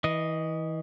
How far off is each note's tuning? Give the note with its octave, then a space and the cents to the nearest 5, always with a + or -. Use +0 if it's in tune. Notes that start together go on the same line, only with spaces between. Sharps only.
E3 -30 D#5 +0